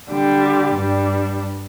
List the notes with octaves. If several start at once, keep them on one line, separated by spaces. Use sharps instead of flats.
D3 G3 D4 G4
G2 G3 D4